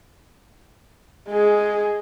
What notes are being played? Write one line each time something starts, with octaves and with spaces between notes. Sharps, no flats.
G#3 G#4